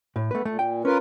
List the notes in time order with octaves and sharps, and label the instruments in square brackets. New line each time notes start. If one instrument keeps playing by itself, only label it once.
[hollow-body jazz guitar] A2
[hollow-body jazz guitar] A3 B4 [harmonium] B3
[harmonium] A#2 [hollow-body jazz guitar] A3
[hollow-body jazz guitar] G5
[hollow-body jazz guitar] C#4 [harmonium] F4 A#4 B4